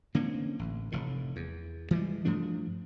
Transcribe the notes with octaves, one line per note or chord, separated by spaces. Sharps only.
D3 A#3 C4 C#4
A1
F1 A2
E2
E3 G3 G#3
G2 F3 A3 D4